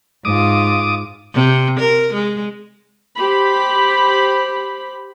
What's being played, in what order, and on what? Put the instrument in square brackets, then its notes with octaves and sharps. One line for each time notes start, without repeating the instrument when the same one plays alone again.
[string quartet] G#2 F4 [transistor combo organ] D6 D#6
[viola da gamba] C3
A#4
G#3
[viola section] G4 C5 B5